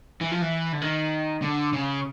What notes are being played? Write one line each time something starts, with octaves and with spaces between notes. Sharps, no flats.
E3
F3
E3
D3
D#3
D3
C#3